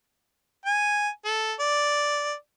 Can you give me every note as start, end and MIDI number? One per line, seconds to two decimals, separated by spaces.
0.66 1.09 80
1.25 1.53 69
1.60 2.34 74